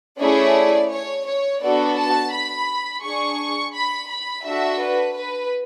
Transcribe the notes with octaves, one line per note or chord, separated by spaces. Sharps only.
A3 C#4 E4 G#4 D5
C#5
C#5
B3 D4 F#4 A4 D5
A5
B5
D4 G#4 C#6
B5
B5
D4 F#4 A4 E5
B4
B4